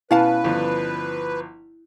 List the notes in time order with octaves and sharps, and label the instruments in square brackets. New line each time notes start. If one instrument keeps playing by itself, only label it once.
[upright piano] B2 [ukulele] C#4 F5 A5 [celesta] E4 [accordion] B4
[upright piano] G1 F3